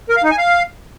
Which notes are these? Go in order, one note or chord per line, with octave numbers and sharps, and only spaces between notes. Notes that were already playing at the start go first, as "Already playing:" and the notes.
A#4
F5
D#4
G#5
F5